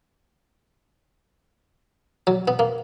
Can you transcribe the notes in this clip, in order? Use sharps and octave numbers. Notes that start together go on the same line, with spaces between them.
F#3
B3
A#3